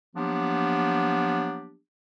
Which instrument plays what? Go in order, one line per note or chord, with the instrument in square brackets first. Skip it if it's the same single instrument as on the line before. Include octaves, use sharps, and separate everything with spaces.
[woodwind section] F3 F#3 A#3 B3 D4 G4